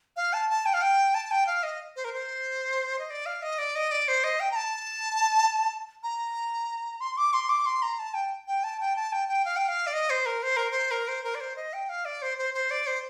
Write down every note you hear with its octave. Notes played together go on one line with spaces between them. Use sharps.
F5
A5
A5
G5
F5
G5
A5
G5
F5
D#5
C5
A#4
C5
D#5
D5
F5
D#5
D5
D#5
D5
C5
D#5
G5
A#5
A5
A#5
C6
D6
C6
D6
C6
A#5
A5
G5
G5
A5
G5
A5
G5
G5
F5
G5
F5
D5
D#5
C5
A#4
C5
A#4
C5
A#4
C5
A#4
D5
C5
D#5
G5
F5
D5
C5
C5
C5
D5
C5